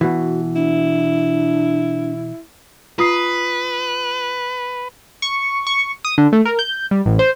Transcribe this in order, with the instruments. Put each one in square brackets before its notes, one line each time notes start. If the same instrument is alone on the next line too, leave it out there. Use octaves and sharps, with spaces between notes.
[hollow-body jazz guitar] B2 E3 [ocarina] F#4
[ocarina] D4 [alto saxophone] E4
[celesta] F4 D#6 C7 [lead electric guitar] B4
[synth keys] C#6
C#6
D#6
D3
A3
A#4
G6
G3
A1
C5